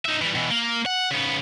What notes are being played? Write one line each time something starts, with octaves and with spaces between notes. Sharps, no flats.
D#4 E5
E3 G3
B2 E3
A#3
F#5
C#3 B3